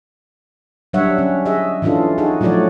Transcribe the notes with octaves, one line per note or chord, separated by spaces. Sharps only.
F#3 G3 D4 C#5 E5 F#5
C#4
G#4 D#5 E5
E3 C#4 D4 F4 A4
D#4 F#4 G#4
F3 F#3 A3 F#4 C#5 D5